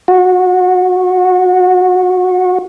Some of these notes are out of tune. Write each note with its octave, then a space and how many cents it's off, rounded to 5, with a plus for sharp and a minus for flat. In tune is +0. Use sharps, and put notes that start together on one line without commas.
F#4 -20